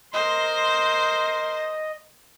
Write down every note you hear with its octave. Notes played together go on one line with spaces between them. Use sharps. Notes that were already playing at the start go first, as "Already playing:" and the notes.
A#4 C5 D#5 C6